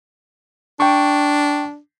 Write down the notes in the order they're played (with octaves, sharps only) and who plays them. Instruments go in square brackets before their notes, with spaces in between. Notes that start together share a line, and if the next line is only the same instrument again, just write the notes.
[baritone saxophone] D4 [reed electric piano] G5 C#6